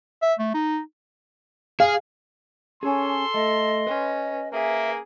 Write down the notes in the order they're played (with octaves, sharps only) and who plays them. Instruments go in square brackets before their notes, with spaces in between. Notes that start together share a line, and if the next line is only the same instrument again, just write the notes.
[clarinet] E5
A3
D#4
[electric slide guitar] G#4 [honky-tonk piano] F5
[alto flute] C#4 [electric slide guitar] G#4 G#5 [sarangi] A4 [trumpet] C6
[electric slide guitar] A3 [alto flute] D#5
[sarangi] C#4 [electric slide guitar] B4
[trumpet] A#3 [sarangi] G#4 [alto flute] E5